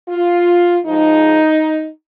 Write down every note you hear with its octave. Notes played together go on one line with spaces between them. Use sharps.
F4
G#2 F3 G#3 D#4